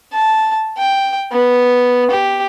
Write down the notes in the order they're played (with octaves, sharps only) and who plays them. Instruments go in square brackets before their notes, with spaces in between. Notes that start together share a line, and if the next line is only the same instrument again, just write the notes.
[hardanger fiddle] A5
G5
B3
G4